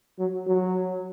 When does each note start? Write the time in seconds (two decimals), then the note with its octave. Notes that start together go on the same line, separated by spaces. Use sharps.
0.19 F#3
0.47 F#3